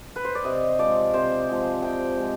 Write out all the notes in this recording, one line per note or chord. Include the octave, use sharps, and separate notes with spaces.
B4
C5
D5
C3 D#5
F3 G#3 D5
C3 C5
F3 G#3
C3 G5
F3 G#3